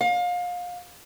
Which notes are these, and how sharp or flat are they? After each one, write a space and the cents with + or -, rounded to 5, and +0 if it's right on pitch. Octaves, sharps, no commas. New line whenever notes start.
F5 +30